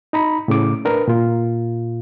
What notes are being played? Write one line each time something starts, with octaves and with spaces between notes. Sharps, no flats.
D#4 A#5 B5
A2 C#3 D6
D4 A#4 B4
A#2 F4